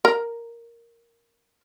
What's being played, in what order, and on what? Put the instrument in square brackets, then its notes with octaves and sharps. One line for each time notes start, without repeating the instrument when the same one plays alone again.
[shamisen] A#4